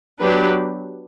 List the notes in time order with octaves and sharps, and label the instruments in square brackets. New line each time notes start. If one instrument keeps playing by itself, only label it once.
[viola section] F#3 B3 D4 G4 B4